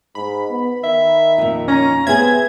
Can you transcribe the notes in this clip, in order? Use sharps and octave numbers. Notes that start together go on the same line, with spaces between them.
G#2 B5
B3
D#3 E5
F2 A#2
C#4 A#5
B3 C4 G#4 E5 G#6